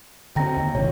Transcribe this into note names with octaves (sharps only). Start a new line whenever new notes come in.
D3 C4 G5 A#5 A#6
D#2
D#1 G#1 C3 C#5